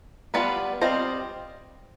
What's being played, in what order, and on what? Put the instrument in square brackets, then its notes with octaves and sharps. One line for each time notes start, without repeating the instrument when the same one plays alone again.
[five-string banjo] G3 B3 F4 B4 D5
G3 C4 F4 C5 D#5